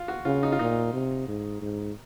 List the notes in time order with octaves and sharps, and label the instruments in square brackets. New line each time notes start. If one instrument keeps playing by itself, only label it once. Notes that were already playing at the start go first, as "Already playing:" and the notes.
Already playing: [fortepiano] F4
F#4
[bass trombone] C#3 [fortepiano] F4
[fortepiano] D#4
F4
[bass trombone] A#2 [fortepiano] D#4
[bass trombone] C3
G#2
G#2